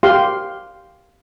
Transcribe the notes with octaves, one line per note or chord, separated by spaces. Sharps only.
G4 F5 C6